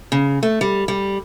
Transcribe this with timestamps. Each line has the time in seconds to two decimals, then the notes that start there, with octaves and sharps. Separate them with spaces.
0.12 C#3
0.43 A3
0.61 G3
0.88 G3